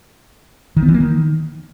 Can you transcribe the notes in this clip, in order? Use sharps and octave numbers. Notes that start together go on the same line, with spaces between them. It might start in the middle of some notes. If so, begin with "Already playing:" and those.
D#3
B3
E3
A#3
D#3